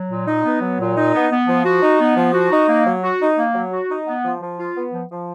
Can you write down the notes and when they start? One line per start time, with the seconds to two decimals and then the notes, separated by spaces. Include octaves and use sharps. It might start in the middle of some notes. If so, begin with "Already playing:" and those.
Already playing: F#3
0.11 A#2
0.27 D#4
0.45 B3
0.62 F#3
0.80 A#2
0.97 D#4
1.15 B3
1.32 B3
1.48 F3
1.66 F#4
1.82 D#4
2.01 B3
2.17 F3
2.34 F#4
2.52 D#4
2.68 A#3
2.86 F#3
3.03 F#4
3.21 D#4
3.38 A#3
3.54 F#3
3.72 F#4
3.89 D#4
4.07 B3
4.24 F3
4.41 F3
4.59 F4
4.76 B3
4.93 F3
5.09 F3